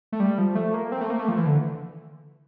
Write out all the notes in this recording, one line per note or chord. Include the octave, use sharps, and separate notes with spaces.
A3
G3
F3
A3
A#3
C4
A3
A#3
A3
F3
E3
D3